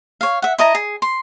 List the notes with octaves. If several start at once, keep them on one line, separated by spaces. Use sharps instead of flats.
C#5 F5
E5 F#5
E4 D#5 A5 A#5
G#4
C6